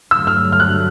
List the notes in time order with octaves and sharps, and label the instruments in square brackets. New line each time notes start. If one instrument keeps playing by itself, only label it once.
[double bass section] G2 D3 F#3 A3 [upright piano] E6
[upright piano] F6
F6
F#6